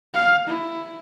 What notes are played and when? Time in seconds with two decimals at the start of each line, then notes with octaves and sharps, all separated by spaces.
0.14 F5
0.48 E4